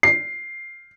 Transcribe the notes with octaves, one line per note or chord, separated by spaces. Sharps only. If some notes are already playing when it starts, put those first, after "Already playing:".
C7